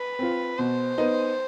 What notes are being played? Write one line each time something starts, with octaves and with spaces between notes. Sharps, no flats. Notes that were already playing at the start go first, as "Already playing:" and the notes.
Already playing: B4
C4 F4
B2 C5
B3 D#4